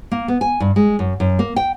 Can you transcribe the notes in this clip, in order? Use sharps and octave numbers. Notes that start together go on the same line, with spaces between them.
A#3
B3
G#5
G2
G#3
F#2
F#2
A#3
G5